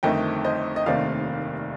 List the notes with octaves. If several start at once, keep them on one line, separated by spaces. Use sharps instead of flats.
G1 F2 D#3 A3 C4 D#5 G5
C5 D#5
D#5
F1 D#2 D#3 A3 C4 D5 F5